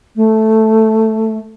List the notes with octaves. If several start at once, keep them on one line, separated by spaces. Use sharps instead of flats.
A3